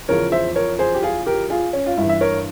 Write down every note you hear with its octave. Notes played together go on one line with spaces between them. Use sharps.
E2 C#3 F3 A#4 C#5
C5 E5
A#4 C#5
G#4 C5
G4
F4 G#4
G4 A#4
F4 G#4
C#4
F4
G2 E3 E4
E5
A#4 C#5